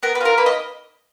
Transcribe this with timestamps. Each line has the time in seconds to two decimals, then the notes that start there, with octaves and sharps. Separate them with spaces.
0.03 B3 A#4
0.15 B4
0.20 F4 G#4
0.25 A#4
0.37 A#3 B4
0.46 D#5